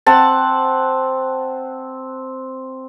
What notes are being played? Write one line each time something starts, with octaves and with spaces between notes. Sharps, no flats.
C4 F#5 A5